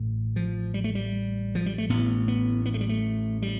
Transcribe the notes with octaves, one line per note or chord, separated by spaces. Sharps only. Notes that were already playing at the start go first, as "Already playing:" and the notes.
Already playing: A1 A2
F3
G3
A3
G3
F3
G3
A3
A1 A2 B3
B3
B3
A3
G3
A3
G3